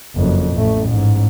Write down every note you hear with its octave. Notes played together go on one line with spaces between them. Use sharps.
F#1 F2
A1 A3
A1 G#2